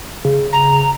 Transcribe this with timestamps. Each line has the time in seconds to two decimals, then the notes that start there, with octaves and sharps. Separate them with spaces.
0.25 C#3
0.53 A#5